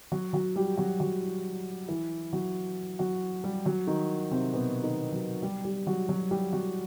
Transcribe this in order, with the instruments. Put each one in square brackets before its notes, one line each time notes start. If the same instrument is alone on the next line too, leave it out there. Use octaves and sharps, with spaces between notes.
[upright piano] F#3 F#4
F#3 F#4
G3 G4
F#3 F#4
F#3 F#4
E3 E4
F#3 F#4
F#3 F#4
G3 G4
F#3 F#4
D#3 D#4
C3 C4
B2 B3
D#3 D#4
F#3 F#4
G3 G4
G3 G4
F#3 F#4
F#3 F#4
G3 G4
F#3 F#4